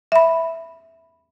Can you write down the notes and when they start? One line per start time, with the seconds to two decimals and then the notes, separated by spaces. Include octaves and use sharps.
0.12 E5 B5